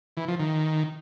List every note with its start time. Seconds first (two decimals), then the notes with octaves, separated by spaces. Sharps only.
0.17 E3
0.28 F3
0.39 D#3